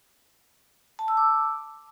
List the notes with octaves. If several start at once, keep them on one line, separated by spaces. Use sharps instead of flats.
A5
E6
D6